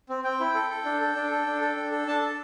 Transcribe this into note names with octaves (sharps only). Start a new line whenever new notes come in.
C4
C4 G5
E4
A4
A4
D4
A4
D4
A4
D4
A4
D4
A4
D4 A5
A4